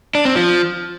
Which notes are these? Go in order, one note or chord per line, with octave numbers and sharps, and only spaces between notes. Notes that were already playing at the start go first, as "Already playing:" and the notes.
D4
C4
F3